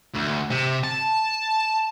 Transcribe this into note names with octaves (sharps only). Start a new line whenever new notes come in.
D2
C3
A5